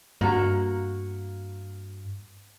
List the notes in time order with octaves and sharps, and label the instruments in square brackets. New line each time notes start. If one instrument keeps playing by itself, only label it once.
[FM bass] G2 [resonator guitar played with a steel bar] A#3 F#4 A#5